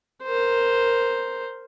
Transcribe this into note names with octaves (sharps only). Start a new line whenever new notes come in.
A#4 C5